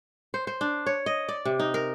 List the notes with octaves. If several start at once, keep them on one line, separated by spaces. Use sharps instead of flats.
C5
C5
D4
C#5
D#5
D5
C3
D#4
A#4